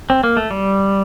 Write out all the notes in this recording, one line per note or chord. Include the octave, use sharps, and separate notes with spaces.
C4
A#3
A3
G3